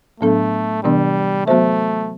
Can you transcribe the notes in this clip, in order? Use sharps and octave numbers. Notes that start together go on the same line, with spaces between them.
A2 F#3 A3 B3 D4 A4
C3 E3 G3 B3 D4
F#3 A3 B3 F#4 C5 E5